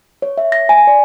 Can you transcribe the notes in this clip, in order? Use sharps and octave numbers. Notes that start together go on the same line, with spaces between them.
C#5
E5
A#6
G#5
D5